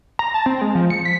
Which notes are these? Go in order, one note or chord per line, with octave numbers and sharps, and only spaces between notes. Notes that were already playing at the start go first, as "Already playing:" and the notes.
A#5
A5
C4
G#3
F3
C#7
B6